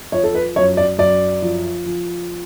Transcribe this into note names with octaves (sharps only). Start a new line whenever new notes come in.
F3 C#5
A4
B4
F#2 C#5
D5
F#2 D5
F3
F3